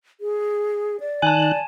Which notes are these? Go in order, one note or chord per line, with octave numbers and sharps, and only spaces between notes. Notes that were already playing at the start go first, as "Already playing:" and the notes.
G#4
D5
D#3 G#5 A5 F#6